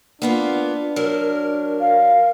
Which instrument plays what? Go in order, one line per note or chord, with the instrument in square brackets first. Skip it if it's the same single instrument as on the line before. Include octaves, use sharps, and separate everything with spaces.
[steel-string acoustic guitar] A#3 B3 F4 [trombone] D4
[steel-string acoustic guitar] F#3 [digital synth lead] A#4
[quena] F5